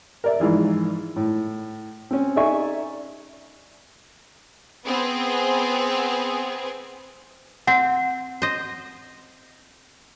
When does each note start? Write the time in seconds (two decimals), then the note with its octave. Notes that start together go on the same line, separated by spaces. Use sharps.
0.24 A#4 D5 E5
0.40 G#2 E3 F3
1.16 A2
2.11 C4 C#4
2.36 D#4 A4 D5 E5 G#5 C#6
4.86 B3 C4 G#4
7.67 C4 F#5
8.42 C5 D#5